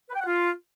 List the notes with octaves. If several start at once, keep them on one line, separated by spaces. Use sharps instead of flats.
B4
G5
F#5
F4